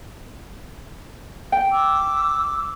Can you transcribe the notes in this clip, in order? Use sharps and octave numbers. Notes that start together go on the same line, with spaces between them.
G5
D6 E6